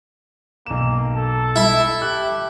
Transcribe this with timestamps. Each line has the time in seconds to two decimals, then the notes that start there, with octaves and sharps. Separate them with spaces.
0.66 B1 A#3 E7
1.16 A4
1.56 E4
2.02 G4 F#6